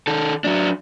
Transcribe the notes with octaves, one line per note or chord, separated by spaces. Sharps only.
D#3 A4
F#3 D4